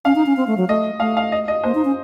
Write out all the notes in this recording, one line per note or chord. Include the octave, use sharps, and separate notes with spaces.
C#4 F5
D#4
C#4
C4
A3
F#3
A3 D#5
A3 F5
F5
D#5
D#5
A#3 C5
D#4
C#4